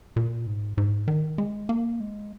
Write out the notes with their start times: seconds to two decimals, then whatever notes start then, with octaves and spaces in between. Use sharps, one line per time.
0.16 A#2
0.47 G#2
0.78 G#2
1.08 D#3
1.38 G#3
1.69 A#3
2.00 G#3